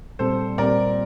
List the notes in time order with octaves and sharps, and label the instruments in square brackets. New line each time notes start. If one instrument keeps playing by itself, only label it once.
[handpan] A#2 G3 C4 [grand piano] A4 C5
[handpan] A#2 G3 C4 [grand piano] A#4 D5